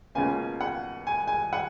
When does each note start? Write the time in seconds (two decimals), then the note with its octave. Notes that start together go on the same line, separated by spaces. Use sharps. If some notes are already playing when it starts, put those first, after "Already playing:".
0.15 C#2 B2 A#3 C#4 G#5
0.61 F#5
1.07 G#5
1.27 G#5
1.53 F#5